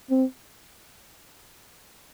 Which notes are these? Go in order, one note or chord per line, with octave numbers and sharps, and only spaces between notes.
C4